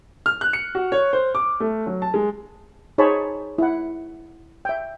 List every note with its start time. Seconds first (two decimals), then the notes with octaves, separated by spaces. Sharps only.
0.26 F6
0.41 F#6
0.53 C#7
0.75 F#4
0.92 C#5
1.13 C5
1.35 D6
1.60 A3
1.86 F#3
2.02 A5
2.14 G#3
2.98 D#4 G#4 C5 C#5 A5 B5
3.58 E4 F#5
4.65 E5 G5